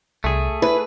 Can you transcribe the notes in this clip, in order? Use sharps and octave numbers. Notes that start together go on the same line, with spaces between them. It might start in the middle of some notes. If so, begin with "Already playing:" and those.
C2 A3 G#4
E4 B4